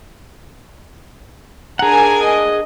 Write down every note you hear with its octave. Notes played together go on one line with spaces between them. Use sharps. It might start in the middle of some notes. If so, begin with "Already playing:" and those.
D4 G#4 A#4 F#5 G#5 A#5
D#5